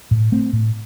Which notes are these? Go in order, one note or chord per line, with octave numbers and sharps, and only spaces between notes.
A2
A3 C4
A2